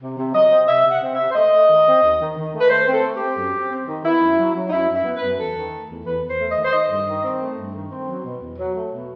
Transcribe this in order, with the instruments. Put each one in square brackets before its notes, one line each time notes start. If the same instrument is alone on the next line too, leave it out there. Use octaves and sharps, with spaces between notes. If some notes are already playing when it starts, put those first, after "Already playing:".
[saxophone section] C3
C3
F#3 D#5
C4
C3 E5
C3 F#5
C4
E5
C3
C5
A3 D#5
A3
D#3
C4
D#2
D#3
D#3
A3
B4
A3 C5
C4
A4
A3
G4
C4
F#2
C4
C4
D#3
B3 E4
F#2
F#3
F#3
D#4
F#2 E4
F#2
E4
B3
B4
F#2
E2 A4
D#3
A3
E2
E2 B4
E2
C5
A3
D#5
D#3
C5
D#3 D#5
G2
D#3
C4
A3
G2
D#3
C4
F#3
B2
E2
F#3
A3
B2